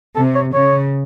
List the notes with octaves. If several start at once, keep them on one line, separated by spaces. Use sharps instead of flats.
C3 A4
C#5
C#3 C#5